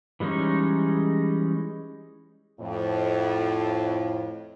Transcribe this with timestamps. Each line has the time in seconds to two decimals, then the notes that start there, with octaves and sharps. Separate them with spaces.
0.20 E3 G3 G#3 C#4 D#4
2.60 F2 A2